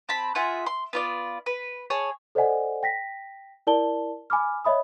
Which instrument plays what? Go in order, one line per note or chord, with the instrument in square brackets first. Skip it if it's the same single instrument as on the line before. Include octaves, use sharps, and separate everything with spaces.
[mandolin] C4 A5 B5
F4 G#4 E5 F#5
C6
B3 F4 D5
B4
G#4 C#5 A5
[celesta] A4 C5 D5 D#5 F#5 G#5
G5 A#6 B6
E4 A#4 D5 A5 G7
G#5 B5 D6 F6
C#5 D#5 E5 B5 D#6